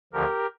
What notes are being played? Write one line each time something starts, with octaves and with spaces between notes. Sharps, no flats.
D2 D3 F3 G4 A#4